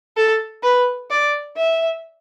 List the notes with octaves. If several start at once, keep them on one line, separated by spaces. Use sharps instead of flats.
A4
B4
D5
E5